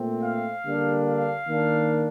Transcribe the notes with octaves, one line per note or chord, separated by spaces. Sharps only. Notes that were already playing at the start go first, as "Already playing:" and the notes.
Already playing: A#2 A3 C4
F5
D3 G3 A#3 D4
F5
D#3 A#3 D4